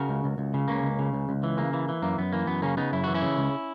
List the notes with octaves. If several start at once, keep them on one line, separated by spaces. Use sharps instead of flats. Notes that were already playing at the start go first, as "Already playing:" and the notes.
Already playing: C#3 F#4 A#4
C#2
C#2
C#2
C#3
C#2 A#3 C#4
C#2
C#3
C#2
C#2
E3
C#3 A#3
E3
E3
F#2 A#3
F#2 B3
E3 A#3
F#2 B3
C#3 A#3 C#4
C#3 B3 D#4
F#2 E4
E3 F#4
C#4 E4
C#3
C#2